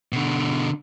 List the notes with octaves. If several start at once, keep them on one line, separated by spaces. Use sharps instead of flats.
B2 D3